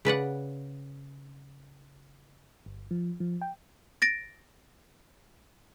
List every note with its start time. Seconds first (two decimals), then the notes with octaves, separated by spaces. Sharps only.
0.05 C#3 B4 D5 F#5
2.66 G1
2.91 F3
3.20 F3
3.41 G5
4.02 A6 A#6 D7